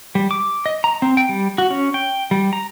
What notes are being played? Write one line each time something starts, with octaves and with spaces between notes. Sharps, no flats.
G3
D6
D#5
A#5
C4
G5
G3
F#4
C#4
G5
G3
A#5